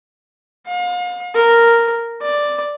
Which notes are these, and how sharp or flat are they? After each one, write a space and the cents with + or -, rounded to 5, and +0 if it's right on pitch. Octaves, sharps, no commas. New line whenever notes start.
F5 +40
A#4 -5
D5 +5